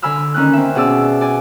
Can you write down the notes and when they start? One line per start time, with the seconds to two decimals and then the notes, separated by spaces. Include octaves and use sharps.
0.02 D3 G#5 B5 E6 F6
0.34 D#3 C#4 F6 F#6
0.53 C4 E5
0.75 B2 G#4 D5 E6
1.21 D5 G#5